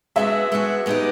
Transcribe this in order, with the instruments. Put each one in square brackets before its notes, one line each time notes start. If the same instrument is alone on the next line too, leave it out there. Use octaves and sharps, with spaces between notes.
[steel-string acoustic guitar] G#3 B3 D4 F#4 [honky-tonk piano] E5
[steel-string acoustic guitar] G#3 B3 D4 F#4
G#3 B3 D#4 G4